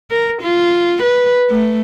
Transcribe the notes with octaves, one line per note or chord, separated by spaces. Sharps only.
A#4
F4
B4
A3